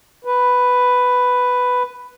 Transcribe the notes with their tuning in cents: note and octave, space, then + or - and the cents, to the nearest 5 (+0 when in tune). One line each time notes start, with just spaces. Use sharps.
B4 +5